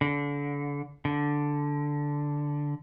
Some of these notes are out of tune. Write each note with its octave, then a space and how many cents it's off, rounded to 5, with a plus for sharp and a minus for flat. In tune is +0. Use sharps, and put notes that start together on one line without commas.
D3 -35
D3 -5